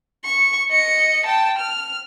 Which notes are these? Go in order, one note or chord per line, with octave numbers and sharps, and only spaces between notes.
C#6
D#5 C#7
G5 A5
F6